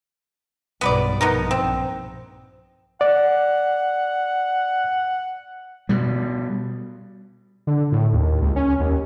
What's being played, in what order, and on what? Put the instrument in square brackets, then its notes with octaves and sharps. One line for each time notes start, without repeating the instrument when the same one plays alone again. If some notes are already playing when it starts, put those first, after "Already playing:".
[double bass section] B1 G2 [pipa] B3 B4 D5
[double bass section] A#1 [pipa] B3 D#4 A#4
[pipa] C4
[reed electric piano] D5 [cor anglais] F#5
[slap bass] B2 G3
[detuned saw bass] D3
A2
D#2
C#2
C#4
D#2